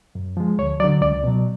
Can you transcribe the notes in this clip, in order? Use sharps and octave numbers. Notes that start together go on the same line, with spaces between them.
F#2
F3 G#3
D2 C#5
D3 F#3 D5
C#2 D5
B2 F#3